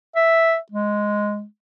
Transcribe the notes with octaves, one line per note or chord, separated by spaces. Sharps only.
E5
G#3